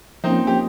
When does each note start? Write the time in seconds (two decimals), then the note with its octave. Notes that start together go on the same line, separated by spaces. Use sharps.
0.24 F3 A#3 C4 C#4 D#4 F4
0.47 G4